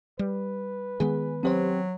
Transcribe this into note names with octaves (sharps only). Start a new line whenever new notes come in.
G3 B4
D#3 G#3 B3 G#4
F#3 C4 G4 C5